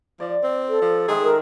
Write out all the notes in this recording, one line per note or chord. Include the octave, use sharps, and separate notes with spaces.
F3 D5
C4
A4
F3
D#3 G#3 G#4 E5
A#4